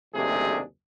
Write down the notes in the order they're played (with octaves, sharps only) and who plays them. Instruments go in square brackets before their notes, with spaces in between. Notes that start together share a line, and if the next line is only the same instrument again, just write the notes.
[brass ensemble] F#1 D#2 C3 A3 D4 G#4